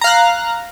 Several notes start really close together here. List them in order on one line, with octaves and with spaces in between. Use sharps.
A#5 F5 F#6